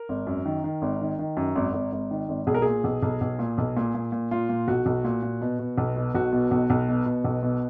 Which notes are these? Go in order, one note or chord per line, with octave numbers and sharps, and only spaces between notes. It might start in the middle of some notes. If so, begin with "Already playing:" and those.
Already playing: A#4
G#1
F#2
D#3
D#3
G#1
D#3
D#3
F#2
G#1
G#1
G#1
D#3
G#1
B1 G#4
A#4
A#2 G#4
B1
B1
B1
A#2
B1
A#2
A#2
A#2
A#2 F4
A#2
B1 F#4
B1
A#2
A#2
B2
B2
B1
B2
B1 F#4
B2
B1
B1
B2
B2
B1
B2